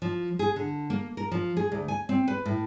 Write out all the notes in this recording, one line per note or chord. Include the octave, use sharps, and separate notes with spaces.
F3
G#4
D3
A#3
A#4
F3
G#4
D2
G#5
C4
B4
A2